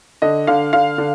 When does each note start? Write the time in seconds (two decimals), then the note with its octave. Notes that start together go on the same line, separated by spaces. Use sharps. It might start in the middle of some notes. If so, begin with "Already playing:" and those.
0.22 D3 D#5
0.47 D3 F5
0.73 D3 F5
0.98 D3